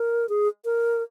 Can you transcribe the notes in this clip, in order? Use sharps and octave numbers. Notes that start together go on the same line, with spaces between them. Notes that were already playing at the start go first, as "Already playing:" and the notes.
Already playing: A#4
G#4
A#4